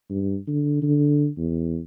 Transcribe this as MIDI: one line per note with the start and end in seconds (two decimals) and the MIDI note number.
0.10 0.37 43
0.48 0.80 50
0.82 1.28 50
1.38 1.79 40